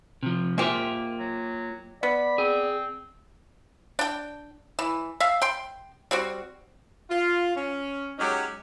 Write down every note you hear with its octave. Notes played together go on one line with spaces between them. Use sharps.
C3 F3
G#3 A#3 C4 F4 G4 E5
F#3
B3 D5 B5
C4 G#4
D4 G5
E3
E5 F5
G5 C6
G3 C4 F#4
F4
C#4
F#3 G#3 C#4 D#4 G4